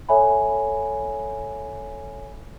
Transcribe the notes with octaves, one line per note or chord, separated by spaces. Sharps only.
A4 C#5 E5 G#5 B5